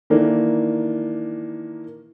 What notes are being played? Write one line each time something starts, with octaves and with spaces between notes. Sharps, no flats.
D#3 E3 A#3 D4